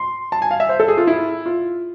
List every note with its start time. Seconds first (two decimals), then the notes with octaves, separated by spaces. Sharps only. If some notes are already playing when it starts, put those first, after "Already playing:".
Already playing: C6
0.32 A5
0.42 G#5
0.51 F5
0.60 E5
0.69 C5
0.80 A4
0.88 G#4
0.98 F4
1.07 E4
1.46 F4